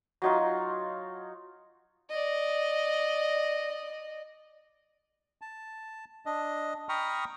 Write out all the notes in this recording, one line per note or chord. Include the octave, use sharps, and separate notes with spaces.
F#3 D#4 F4
D5 D#5
A5
D4 D#5
G5 A#5 B5 C#6 D#6 F6